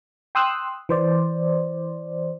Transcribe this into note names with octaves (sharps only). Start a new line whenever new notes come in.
G5 C6 D#6 E6 F#6
E3 C5 D5